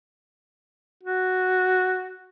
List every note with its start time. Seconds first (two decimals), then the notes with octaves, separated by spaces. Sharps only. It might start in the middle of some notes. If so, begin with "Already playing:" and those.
1.03 F#4